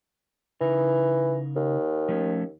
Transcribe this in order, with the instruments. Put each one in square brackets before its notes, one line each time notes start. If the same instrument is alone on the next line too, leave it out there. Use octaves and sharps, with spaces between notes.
[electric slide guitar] C#3 D#4 A#4 [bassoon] E3
[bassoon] D#2
[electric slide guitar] F3 A3 C#4